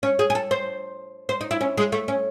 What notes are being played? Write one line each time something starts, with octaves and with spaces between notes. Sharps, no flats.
C#4
G#4
G#4
A4
C5
C5
D#4
E4
C#4
G#3
A3
C#4